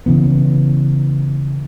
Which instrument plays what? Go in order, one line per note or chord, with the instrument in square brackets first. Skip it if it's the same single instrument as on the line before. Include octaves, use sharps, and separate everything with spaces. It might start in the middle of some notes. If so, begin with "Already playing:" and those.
[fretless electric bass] C#3 E3 B3